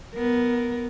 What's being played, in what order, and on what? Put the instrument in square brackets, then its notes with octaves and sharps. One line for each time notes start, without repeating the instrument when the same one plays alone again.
[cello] B3 A#4